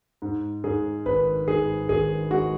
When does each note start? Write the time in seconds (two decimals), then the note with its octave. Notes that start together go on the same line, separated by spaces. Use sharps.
0.22 G#2
0.64 G#2 G#4
1.06 G#1 B4
1.48 G#2 G#4
1.89 G#1 G#4
2.31 G#3 F#4